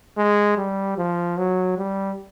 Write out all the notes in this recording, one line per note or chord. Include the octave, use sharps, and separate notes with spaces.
G#3
G3
F3
F#3
G3